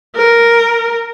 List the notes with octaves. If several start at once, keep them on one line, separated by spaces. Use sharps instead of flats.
A#4